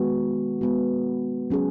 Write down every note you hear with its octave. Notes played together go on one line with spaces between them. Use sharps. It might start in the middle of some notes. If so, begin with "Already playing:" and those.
Already playing: D#3 G#3 B3 F#4
G#3 B3 F#4
F#3 C#4 G#4